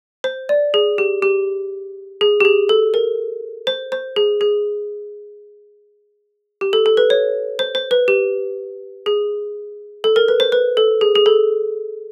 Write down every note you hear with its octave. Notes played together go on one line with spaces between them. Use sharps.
C5
D5
G#4
G4
G4
G#4
G4
G#4
A4
A#4
C5
C5
G#4
G#4
G4
A4
A4
B4
C#5
C5
C5
B4
G4
G#4
A4
A#4
B4
C5
B4
A4
G#4
G#4
A4